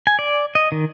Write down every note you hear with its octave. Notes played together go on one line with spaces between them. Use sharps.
G#5
D5
D#5
D#3